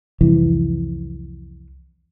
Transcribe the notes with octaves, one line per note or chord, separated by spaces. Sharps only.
C2 F2 E3